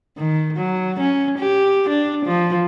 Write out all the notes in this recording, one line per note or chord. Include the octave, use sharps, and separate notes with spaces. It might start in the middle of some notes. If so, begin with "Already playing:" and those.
D#3
F#3
C#4
G4
D4
F3